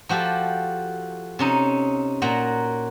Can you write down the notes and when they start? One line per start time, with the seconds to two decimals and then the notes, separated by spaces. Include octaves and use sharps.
0.09 F3 F#4 G4 A4
1.39 C3 C#4 D#4
2.22 A#2 F#4 F#5 A#5